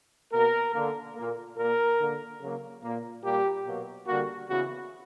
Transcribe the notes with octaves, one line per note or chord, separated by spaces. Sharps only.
B2 A#3 A#4
D3 A#3
A#2 A#3
A#2 A#3 A#4
D3 A#3
C#3 F#3 A#3
A#2 A#3
A#2 G3 A#3 G4
B2 F#3 A#3
D3 G3 A#3 F#4
C#3 E3 B3 F#4